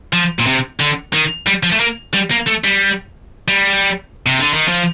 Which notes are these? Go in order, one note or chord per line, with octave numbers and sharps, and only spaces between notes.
F3
A#2
C3
D3
D#3
G3
F3
A3
A#3
G3
A#3
A3
G3
G3
C3
D3
D#3
F3